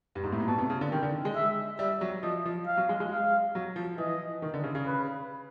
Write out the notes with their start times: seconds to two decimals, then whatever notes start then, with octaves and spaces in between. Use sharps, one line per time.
0.15 G2
0.23 G#2
0.32 A2
0.40 A#2
0.48 B2 A5
0.59 C3
0.70 C#3
0.81 D3
0.92 D#3 G5
1.03 D3
1.25 G#3
1.35 E5
1.79 G3 E5
2.01 F#3
2.23 F3 D#5
2.46 F3
2.67 F5
2.77 F#3
2.89 G#3
3.00 G#3
3.11 F5
3.55 F#3
3.76 F3
3.98 E3 D#5
4.42 D#3
4.54 D3
4.64 C#3
4.75 C#3
4.86 B4